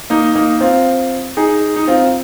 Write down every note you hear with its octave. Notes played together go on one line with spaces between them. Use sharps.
A#3 D#4
A#3 D#4
C4 F4
D#4 G#4
D#4
C4 F4